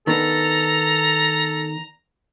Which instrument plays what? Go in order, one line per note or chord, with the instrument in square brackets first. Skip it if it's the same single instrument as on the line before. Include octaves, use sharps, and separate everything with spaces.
[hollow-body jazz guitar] D#3 B3 D4 [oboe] A4 [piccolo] A#5